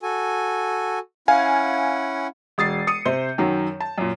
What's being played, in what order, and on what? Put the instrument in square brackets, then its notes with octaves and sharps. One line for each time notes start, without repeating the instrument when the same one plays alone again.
[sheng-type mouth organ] F#4 A4 G#5
[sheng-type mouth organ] C#4 E4 F#5 [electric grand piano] F5 G#5
[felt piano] E1 D#6 A6 C7
D#6 C#7 D#7
C3 C5 G6
F#2 D#3 F#3
A5
F#2 A#2